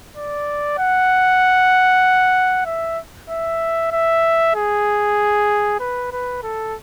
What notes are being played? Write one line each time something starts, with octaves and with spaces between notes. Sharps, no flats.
D5
F#5
E5
E5
E5
G#4
B4
B4
A4